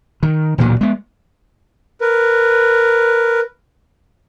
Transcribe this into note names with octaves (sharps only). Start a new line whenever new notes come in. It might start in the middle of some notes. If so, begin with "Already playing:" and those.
D#3
E1 D2 A#2 F#3
G#3 B3
A#4 B4